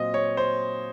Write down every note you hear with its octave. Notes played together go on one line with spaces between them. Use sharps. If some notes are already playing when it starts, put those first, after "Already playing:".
Already playing: A#2 F#3 C4 D#5
C#5
C5